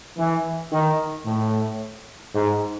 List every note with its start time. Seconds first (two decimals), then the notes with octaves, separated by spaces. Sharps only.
0.18 E3
0.72 D#3
1.26 A2
2.34 G#2